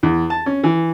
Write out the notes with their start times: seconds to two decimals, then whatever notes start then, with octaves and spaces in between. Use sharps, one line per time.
0.03 E2
0.30 A5
0.46 C#4
0.64 E3